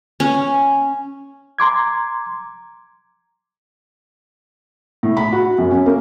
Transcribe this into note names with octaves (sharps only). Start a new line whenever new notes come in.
C#4
A#5 C6 D6 G#6
A2
B5
F#4
F#2
C#4
A#3